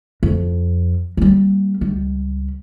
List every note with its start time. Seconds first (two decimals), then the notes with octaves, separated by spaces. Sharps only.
0.23 F2
1.17 G3 A#3
1.81 C#2 G3